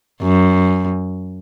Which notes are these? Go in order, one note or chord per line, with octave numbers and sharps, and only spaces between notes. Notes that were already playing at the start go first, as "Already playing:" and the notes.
F#2